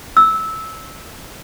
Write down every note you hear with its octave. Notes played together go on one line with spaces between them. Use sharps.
E6